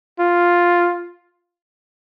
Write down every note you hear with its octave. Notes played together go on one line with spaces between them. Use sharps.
F4